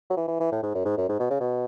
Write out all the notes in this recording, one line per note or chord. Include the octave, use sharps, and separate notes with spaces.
F#3
E3
E3
E3
A2
G#2
F#2
G#2
F#2
G#2
B2
C#3
B2